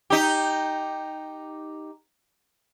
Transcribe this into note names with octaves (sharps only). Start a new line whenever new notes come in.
D#4 G4